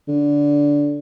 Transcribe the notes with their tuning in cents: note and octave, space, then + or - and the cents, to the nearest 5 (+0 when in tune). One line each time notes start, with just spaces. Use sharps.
D3 -15